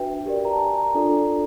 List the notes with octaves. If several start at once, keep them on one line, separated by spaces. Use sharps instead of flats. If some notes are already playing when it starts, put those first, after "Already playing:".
Already playing: D4 F#4 B4 E5 G5
G4 A#4 D5
A#5
A5
G#5
A#5
D4 F4 A4 D5